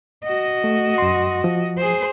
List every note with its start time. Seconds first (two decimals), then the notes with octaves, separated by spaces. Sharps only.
0.24 F#4 D#5
0.64 A3
0.98 F#2 C6
1.44 F3
1.77 G#4 C5